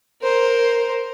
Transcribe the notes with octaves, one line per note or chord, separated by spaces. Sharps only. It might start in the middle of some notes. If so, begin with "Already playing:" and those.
A#4 C5